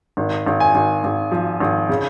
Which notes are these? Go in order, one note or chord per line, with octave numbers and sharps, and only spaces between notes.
G#1
G#1
G#5
G#1
G#1
F3
G#1
C#3